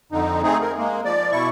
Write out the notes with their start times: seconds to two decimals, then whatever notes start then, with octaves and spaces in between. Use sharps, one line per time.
0.12 F2 D3 D#4
0.43 A3 C4 D#4 G#4
0.61 A#4
0.78 G#3 A#3
1.05 F3 D5
1.32 B2 E4 C#6